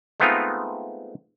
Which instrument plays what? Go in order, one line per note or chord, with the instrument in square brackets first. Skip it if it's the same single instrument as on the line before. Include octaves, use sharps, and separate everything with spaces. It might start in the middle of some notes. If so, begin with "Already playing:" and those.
[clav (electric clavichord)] G#3 A3 B3 C4 D#4 F4